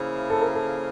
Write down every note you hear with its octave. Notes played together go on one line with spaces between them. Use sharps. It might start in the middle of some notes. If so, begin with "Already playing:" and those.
Already playing: C#3 F3 A#3 E4
A4
A#4
A4